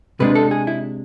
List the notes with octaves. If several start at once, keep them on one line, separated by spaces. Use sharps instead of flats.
C3 G#3 D4 B4
A4
G#4
E4